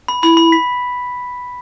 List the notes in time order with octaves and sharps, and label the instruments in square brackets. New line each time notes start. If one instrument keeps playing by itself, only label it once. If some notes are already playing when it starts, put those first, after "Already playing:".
[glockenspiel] B5
[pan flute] E4 [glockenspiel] B5
[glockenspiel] B5
B6